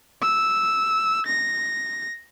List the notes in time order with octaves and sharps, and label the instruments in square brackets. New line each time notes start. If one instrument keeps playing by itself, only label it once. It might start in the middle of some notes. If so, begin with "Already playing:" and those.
[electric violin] E6
A#6